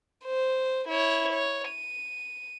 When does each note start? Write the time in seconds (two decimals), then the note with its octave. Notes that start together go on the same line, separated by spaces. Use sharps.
0.25 C5
0.88 E4 C#5
1.33 C#5
1.69 D#7